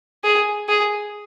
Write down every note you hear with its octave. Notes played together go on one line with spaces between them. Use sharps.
G#4
G#4